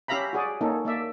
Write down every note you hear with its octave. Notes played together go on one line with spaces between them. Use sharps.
C#4 G4 E5 F5 A#5 B5
F#4 G#4 D5
A#3 C#4 D#4 A4
A#3 D5 E5